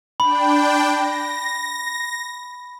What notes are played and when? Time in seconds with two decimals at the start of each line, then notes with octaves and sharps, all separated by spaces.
0.20 D4 G5 B5
0.91 A#6